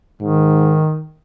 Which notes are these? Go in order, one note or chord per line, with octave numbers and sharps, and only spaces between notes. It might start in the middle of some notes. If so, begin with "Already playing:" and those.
G#2 D#3